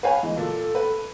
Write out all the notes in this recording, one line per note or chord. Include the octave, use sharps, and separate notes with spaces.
B4 C#5 F5 G#5
E3 G#3
A#2 A4
B4